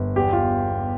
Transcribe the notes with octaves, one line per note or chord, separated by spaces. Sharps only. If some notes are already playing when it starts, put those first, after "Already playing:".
Already playing: G1
E2 G4
F4